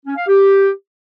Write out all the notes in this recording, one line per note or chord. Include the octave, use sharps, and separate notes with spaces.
C#4
F5
G4